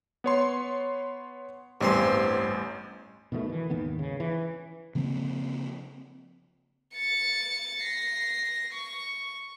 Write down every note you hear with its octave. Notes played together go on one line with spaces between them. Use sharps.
B3 C#5 C6
A1 E2 G2 C4 C6
B2 D#3 F3 A3
E3
G#1 D#2 D#3 B3
C#3
E3
C#3 F3 A#3 C4
A6 C#7
A#6 C7
C#6